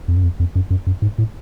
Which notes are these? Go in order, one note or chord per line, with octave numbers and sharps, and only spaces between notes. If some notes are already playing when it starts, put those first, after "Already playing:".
F2
F#2
F2
F2
F#2
F#2
F#2
G#2
A2